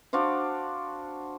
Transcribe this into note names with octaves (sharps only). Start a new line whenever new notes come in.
D4 F#4 C5 F5